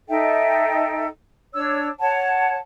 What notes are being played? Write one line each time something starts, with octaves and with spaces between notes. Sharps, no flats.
D#4 A4 E5 G5
D4 C#5 E6
C#5 F#5 A5